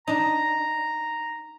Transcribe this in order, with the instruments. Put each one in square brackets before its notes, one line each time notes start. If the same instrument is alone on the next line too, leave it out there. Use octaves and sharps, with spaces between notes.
[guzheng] D4 D#4 [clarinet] A#5